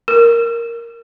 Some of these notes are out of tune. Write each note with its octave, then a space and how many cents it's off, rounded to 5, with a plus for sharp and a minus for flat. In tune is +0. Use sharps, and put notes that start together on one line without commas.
A#4 +0